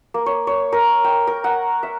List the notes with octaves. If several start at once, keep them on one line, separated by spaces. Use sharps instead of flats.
A#3
C#5
C#5
A#4
G5
A#4
F#5
E5